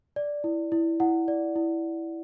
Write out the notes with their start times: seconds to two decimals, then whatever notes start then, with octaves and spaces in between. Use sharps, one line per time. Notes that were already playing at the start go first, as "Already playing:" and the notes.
0.16 D5
0.44 E4
0.72 E4
1.00 E4 F#5
1.28 D5
1.56 E4